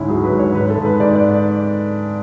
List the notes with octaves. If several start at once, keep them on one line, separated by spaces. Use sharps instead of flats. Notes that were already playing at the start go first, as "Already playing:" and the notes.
Already playing: D2 G#2 C#4 E4
F#3 G#4
B4
G#2
C#5
G#2 B4
A4
G#2
B4
G#2 D5
D5